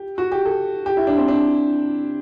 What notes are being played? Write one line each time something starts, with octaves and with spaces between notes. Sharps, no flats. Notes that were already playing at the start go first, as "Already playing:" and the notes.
Already playing: G4
F#4
G4
A4
G4
E4
D4
C4
D4